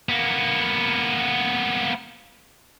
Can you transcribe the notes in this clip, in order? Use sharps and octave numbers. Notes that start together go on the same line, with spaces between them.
A#3 B3